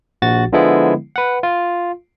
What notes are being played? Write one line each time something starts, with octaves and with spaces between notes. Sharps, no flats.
A#1 F#4 A6
D3 F3 G#3 B3 E4
B4 F#5
F4